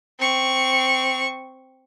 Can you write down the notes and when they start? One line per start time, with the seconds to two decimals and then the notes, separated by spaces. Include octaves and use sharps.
0.19 C4 C#6